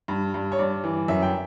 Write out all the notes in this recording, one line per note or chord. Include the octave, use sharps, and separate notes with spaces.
G2
G2
C#5
G2 D5
E3
F#2 E5
G5